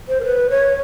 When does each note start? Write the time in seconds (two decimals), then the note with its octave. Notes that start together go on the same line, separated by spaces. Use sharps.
0.09 C5
0.21 A#4
0.25 B4
0.50 C#5